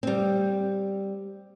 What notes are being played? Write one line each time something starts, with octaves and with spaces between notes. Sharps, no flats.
G3 C4